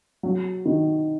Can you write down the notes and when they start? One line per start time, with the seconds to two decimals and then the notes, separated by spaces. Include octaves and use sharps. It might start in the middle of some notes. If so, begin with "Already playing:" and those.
0.23 F#3
0.65 D#3